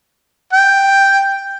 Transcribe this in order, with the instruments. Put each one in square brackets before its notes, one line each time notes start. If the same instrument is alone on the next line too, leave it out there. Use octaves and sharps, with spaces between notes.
[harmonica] G5